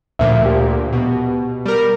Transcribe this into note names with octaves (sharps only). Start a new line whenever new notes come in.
D2 A#2 F3 E5
G4
B2
G3 A#4